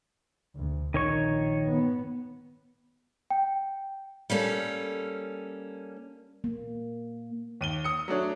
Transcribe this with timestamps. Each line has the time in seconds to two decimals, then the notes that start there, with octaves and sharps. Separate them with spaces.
0.55 D2
0.94 A#1 D#3 C#5 C#6
1.65 B3
3.30 G5
4.30 G3 A#3 C#4 A4
6.44 A#3
7.61 D#2 D#7 G7
7.84 D#6 C#7
8.08 F#3 A3 D4 C#5